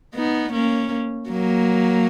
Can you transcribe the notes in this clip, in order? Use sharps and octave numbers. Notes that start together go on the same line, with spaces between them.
B3 D#4
A#3 C#4
F#3 A#3